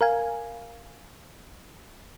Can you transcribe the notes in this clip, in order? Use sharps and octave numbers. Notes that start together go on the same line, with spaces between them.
A#4 F5 G#5